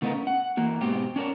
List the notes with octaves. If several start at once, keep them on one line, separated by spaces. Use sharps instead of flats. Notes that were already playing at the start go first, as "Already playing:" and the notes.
C#3 A3 B3 C4 D#4 A#4
C#4
F#5
E3 A#3 F#4
G#2 B2 C4 G4
C#4 D4 A#4 C#5